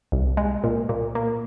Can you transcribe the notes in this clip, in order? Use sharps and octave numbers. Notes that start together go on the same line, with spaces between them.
C2
G#3
A#2
A#2
A#3